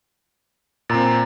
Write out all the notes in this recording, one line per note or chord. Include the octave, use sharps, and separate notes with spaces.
A#2 C4 A#5 A6